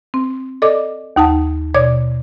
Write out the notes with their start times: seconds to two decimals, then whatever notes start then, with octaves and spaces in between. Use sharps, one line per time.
0.14 C4
0.62 A4 D5 D#5 D6
1.16 D#2 D#4 F#5 A5
1.74 B2 C#5 D5 D6 G#6